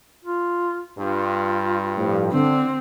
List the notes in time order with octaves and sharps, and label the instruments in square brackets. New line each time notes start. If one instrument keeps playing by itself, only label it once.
[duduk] F4
[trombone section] G2 [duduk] F4
[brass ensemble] A2 F3 G3
[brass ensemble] D3 [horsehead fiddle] C4 [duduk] D4